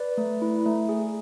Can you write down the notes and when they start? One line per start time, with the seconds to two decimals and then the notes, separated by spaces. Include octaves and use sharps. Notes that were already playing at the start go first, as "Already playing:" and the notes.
Already playing: B4 D5
0.17 A3
0.42 E4
0.66 A3
0.89 G#4